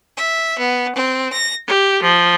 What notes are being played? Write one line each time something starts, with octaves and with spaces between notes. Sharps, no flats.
E5
B3
C4
A#6
G4
F3